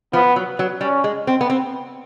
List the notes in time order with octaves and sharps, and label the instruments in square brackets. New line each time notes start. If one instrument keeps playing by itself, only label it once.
[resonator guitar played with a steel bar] F3 [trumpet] B3
[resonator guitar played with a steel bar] F#3
F#3
[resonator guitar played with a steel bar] G3 [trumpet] C#4
[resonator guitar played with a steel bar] G#3
C4
B3
C4